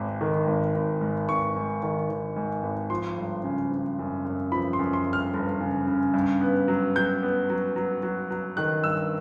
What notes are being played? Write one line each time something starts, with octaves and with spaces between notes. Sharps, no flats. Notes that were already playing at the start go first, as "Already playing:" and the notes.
Already playing: G#1 G#2
D#3
G#1
G#1
G#2
G#1 C#6
G#2
D#3
D#3
G#2
G#1
F3 C6
G1
C#3
C#3
F#2
F#2
F3 B5
C6
F#2
C6
G1
F6
G1
C#3
C#3
G2
B3
F#3
F#3 G6
B3
F#3
F#3
F#3
F#3
D#3 F#6
G2 E6